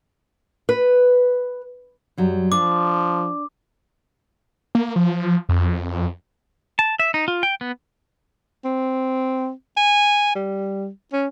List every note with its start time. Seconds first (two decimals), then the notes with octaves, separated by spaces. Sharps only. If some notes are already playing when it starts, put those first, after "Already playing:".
0.69 B4
2.18 F#2 F#3 G3
2.52 F3 D4 D6
4.75 A#3
4.96 F3
5.49 F2
6.79 A5
7.00 E5
7.14 D#4
7.28 F4
7.43 G5
7.61 B3
8.65 C4
9.77 G#5
10.35 G3
11.13 C#4